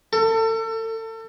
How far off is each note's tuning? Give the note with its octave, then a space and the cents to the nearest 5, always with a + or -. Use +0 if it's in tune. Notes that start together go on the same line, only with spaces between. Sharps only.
A4 +35